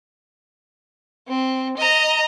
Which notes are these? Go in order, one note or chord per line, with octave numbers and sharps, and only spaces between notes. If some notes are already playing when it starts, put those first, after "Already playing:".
C4
D#5 A#5